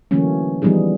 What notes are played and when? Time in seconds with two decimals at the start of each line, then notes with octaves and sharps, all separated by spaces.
0.11 D3 E3 F#3 A3 A#3 C#4
0.62 E3 F3 G3 B3 D#4 G#4